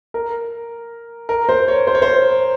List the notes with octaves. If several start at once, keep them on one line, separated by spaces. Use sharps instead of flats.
A#4
A#4
C5
C#5
C5
C#5
C5